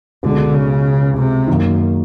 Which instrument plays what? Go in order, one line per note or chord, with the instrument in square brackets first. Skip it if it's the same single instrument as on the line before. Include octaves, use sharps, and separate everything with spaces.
[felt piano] C#2 B2 G#3 [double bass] D3
[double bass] C#3
C3
[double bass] F#2 [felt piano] D#3 F#3 A#3